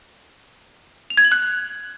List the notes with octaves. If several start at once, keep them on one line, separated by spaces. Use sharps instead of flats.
F7
G#6
F#7
F#6